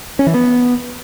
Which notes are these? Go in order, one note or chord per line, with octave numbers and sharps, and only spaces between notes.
C#4
E3
B3